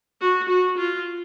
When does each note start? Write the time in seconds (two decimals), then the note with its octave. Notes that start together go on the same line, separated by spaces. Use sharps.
0.21 F#4
0.49 F#4
0.78 F4